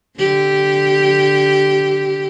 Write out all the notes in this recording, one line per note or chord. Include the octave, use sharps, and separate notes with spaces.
D3 G4